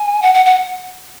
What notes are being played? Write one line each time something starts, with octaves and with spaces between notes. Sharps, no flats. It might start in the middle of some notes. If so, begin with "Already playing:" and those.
Already playing: G#5
F#5
F#5
F#5